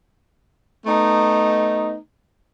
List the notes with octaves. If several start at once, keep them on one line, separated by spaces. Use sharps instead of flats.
A3 B3 D#4